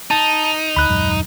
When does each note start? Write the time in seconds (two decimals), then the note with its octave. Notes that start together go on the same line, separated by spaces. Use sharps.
0.11 D#4 A5
0.76 D2 B5 F#6
0.89 D#1 F#2 G#3